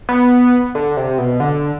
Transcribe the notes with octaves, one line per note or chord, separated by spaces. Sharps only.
B3
D3
C3
B2
D3